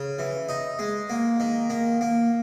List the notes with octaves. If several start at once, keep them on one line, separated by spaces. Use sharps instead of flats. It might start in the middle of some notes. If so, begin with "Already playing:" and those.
Already playing: C#3 C#4
E3
D#4
G#3
A#3
D#3
A#3
A#3